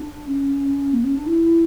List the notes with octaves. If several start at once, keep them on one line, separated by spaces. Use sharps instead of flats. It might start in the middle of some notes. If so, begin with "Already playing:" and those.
Already playing: D4
C#4
A#3
C#4
D4
E4